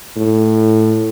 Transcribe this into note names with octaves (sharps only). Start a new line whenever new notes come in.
A2